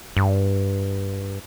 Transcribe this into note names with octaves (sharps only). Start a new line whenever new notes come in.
G2